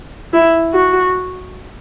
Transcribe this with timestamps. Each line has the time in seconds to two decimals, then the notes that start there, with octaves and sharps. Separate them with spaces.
0.34 E4
0.74 F#4